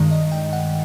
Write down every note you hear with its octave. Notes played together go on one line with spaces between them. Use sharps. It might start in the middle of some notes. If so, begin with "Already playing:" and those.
Already playing: G2 D#3 G#3
D#5
G5
F#5